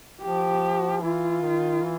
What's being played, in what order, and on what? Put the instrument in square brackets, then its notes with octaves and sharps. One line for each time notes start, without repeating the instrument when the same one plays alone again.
[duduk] F3 [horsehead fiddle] G4
[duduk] E3 [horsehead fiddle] F4
[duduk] D#3
E3